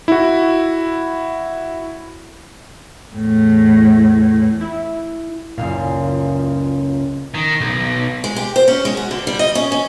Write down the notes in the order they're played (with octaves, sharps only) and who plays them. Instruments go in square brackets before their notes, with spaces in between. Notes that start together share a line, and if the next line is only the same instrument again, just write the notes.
[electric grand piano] E4 F#4
[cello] E2 A2
[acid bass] E4
[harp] F#1 C#2 F5 [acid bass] A#2
[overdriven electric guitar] D#3
B1
[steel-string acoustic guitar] G#3
G4
C5
C#4
G#3
F#4
D3
G3
D#5
C#4
C#4